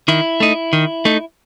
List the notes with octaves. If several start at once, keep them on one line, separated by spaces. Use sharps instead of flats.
D#3 E4
A3 D#4
D#3
A3 D#4